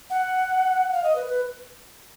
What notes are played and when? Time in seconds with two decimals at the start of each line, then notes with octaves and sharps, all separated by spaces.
0.10 F#5
0.93 F5
1.03 D#5
1.16 B4
1.26 B4